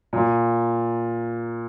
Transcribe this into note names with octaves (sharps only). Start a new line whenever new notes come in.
A#2